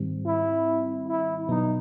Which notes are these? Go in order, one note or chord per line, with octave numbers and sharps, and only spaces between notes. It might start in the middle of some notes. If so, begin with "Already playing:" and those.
Already playing: G#2 D#3 G3 C4
E4
E4
B2 F#3 B3 D#4